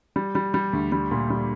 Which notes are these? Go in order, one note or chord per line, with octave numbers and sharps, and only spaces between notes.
G3
G3
G3
D2
G3
A#2
G3